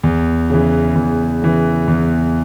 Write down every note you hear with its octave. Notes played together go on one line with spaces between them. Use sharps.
E2
C#3 E3
E2
C#3 E3
E2